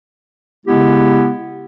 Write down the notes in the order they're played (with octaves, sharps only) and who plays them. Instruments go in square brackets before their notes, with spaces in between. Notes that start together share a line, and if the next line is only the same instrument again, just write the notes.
[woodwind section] C#3 G#3 B3 E4 G4